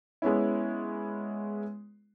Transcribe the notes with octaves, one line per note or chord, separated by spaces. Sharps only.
G#3 B3 C#4 E4